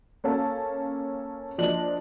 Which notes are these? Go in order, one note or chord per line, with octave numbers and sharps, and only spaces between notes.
A#3 C#4 A4 F5
F3 A#3 D4 D#5 F#7